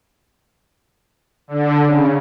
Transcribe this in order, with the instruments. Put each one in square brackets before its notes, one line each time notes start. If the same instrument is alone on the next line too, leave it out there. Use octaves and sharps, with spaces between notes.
[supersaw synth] D3
C#3